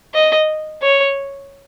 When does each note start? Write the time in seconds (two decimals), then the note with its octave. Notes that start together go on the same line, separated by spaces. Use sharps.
0.14 D#5
0.82 C#5